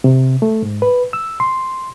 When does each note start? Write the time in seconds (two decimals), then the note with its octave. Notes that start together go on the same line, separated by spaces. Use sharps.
0.04 C3
0.42 A3
0.62 G#2
0.82 B4
1.13 E6
1.40 C6